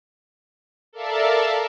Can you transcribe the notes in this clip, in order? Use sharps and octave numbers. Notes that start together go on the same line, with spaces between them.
A4 A#4 D5 E5 F5 A5